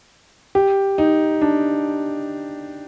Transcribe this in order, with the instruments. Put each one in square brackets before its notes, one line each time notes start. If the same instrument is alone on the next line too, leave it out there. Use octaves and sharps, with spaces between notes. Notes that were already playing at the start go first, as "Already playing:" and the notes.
[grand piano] G4
D#4
D4